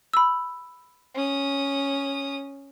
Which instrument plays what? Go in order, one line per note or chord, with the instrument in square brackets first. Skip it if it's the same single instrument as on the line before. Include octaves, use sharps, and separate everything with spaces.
[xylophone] B5 E6
[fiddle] C#4 D#6